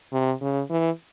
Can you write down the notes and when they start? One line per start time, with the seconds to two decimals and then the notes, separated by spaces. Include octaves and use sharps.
0.12 C3
0.41 C#3
0.70 E3